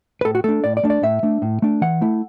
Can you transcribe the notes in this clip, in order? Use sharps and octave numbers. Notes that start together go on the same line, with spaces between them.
B4
A2 A4
F#4
A3 D4 A4
A2 D5
D5
A3 D4
D5
A2 E5
A3 D4
A2
A3 D4
E3 F#5
A3 E4